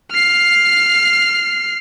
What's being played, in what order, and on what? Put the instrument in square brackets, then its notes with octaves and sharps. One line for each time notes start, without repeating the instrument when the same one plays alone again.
[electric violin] F6 C7